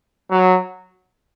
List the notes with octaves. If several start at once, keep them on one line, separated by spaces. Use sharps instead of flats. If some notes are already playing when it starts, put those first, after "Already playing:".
F#3